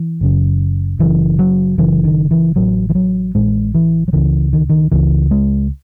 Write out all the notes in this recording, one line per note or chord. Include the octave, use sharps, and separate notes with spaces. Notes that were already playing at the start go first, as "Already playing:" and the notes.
Already playing: E3
F#1 F#2 C#3
F#1 F#2 C#3 E3
F#3
F#1 F#2 C#3 E3
D#3
E3
A1 A2 F#3
E3
F#3
A1 A2 G#3
E3
F#3
C#2 C#3 E3
D#3
D#3
C#2 C#3 E3
G#3